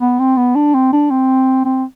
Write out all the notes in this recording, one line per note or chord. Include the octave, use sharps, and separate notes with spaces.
B3
C4
B3
D4
C4
D4
C4
C4